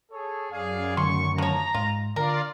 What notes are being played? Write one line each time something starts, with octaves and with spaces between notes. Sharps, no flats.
G#4 A4 C#5
F#2 G#4 D5 F5
D3 D#3 A3 C6 C#6
F3 C#5 A#5
G#2 F4
D3 F4 A#4 D5 F5